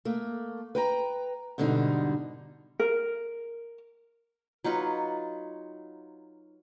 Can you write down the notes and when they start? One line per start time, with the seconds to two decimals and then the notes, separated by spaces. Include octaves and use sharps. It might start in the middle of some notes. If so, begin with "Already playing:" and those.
0.05 A3 A#3
0.75 B4 G5 A#5
1.58 G#2 B2 D3 G3 C#4 D#4
2.80 A#4
4.64 F#3 D#4 F4 B4